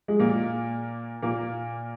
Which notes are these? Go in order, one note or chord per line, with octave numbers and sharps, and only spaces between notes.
G#3
A#2 A#3
A#2 A#3